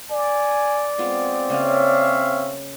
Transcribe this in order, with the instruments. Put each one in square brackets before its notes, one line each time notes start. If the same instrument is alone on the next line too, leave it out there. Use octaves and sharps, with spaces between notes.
[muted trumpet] D5 [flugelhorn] G#5
[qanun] G#3 B3 F4 [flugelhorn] C4
[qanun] C#3 A#3 C#4 [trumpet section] C#5 E5 F5